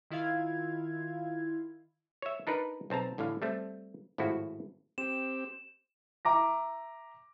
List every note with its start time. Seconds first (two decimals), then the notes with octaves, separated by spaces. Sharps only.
0.11 D#3 E4 F4 F5 G#6
2.22 C#5 E5
2.47 D4 D#4 A#4 B4
2.90 B1 C4 A5 A#5
3.18 A1 A2 D3 F5
3.42 G3 A3 C4
4.18 G#1 A2 F3 E4 F#4
4.98 C4 G4 E7
6.25 E5 A#5 D6 A#6